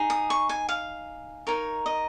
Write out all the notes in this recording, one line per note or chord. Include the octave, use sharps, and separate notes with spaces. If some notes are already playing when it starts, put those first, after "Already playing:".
Already playing: D#4 G#4
D#6
C#6
G#5
F5
D#4 A#4 C#5
D#5